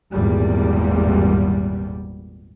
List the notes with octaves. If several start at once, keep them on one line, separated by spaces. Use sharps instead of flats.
G#1 E2 A#2 G3